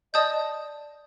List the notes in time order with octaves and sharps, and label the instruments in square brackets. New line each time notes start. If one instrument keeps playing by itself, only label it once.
[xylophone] D5 A5 D#6 G6 [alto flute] D#5